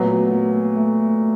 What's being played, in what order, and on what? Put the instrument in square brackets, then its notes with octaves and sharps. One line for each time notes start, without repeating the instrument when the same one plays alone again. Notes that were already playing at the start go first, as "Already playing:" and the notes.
Already playing: [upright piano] A#2 F#3 B3 [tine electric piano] A3
[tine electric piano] A#3
A3